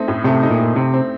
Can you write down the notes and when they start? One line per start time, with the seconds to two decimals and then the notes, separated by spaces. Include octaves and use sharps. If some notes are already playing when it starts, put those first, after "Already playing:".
Already playing: A3 C4 D#4
0.08 A2
0.24 C3 A3
0.43 D#4
0.51 A#2
0.59 A3
0.76 C3 C4
0.94 C4